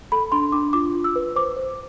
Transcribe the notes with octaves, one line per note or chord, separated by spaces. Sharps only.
A4 B5
D4 C6
D4 D6
F4 D6
F4
E6
B4
C5 D6
C5